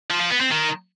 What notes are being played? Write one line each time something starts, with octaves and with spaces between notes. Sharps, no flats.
F3
F3
B3
C4
D#3